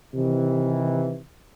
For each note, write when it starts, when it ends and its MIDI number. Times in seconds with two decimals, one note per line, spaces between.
0.14 1.19 48
0.14 1.19 51
0.14 1.19 52